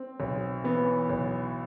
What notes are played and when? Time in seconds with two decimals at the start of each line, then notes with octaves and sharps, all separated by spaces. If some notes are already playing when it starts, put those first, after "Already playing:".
Already playing: C4
0.20 B1
0.64 E3 B3
1.09 B1